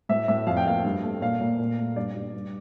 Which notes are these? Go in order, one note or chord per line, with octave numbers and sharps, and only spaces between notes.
A2 E5
A2 E5
F2 F5
G5
A#3 F5
G2
A3
A#2 F5
A#2
A#2
A3
G2 D5
G2
G2